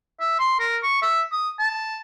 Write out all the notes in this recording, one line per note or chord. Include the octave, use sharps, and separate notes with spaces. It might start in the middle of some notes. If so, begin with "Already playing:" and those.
E5
C6
A#4
C#6
E5
D#6
A5